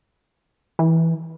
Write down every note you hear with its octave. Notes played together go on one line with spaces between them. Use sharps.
E3